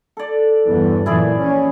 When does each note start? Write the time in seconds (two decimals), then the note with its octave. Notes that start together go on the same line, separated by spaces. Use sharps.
0.17 A4 D5
0.68 G1 E2 E3
1.06 F#2 A#2 E3 E4 G#4 D5
1.38 A#1 C#4